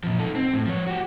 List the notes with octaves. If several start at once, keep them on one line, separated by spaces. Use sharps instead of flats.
A#2 F3
D#4 A4
C4
A2
F3 C#5
F#4 G4